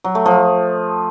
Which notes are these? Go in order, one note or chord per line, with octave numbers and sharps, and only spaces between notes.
F#3
A3
F3